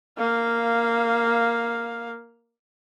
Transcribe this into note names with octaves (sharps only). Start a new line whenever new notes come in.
A#3 F5